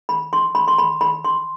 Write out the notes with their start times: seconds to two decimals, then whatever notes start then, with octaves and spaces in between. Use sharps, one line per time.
0.09 B5
0.33 C6
0.55 B5
0.68 C6
0.78 B5
1.01 B5
1.25 C6